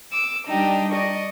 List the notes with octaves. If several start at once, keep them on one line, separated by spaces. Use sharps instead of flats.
D6 E6
G3 D4 D#4 G4
D5 D#5 C#6